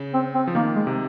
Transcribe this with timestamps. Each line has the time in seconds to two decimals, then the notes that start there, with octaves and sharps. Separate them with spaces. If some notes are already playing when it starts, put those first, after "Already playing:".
Already playing: C#3
0.14 C4
0.34 C4
0.47 F3
0.55 D#3 A#3
0.76 G#3
0.87 C3